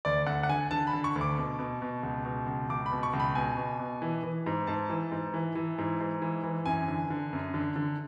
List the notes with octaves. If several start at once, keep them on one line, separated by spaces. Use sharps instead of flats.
D2 D5
D2 F#5
F#5
D3 G#5
D3 A5
B5
D3
C#6
D2
D6
B2
B2
B2
C#2
B2
C#2
C#2 D6
B5
B2
C#6
C#2
B5
B2 G#5
B2
B2
E3
E3
G#2
G#2 A5
E3
G#2
E3
E3
G#2
G#2
E3
E3
F#2 G#5
D3
D3
F#2
D3
D3